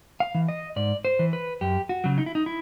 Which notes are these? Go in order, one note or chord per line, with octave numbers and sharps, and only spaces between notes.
F5
E3
D#5
G#2 D5
C5
E3
B4
F#2 G4
F#4
C#3 F#3
D#4
E4
D#4
E4